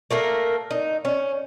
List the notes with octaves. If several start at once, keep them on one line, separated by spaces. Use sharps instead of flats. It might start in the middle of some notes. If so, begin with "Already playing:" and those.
A3 A#3 A#4
D#4
C#4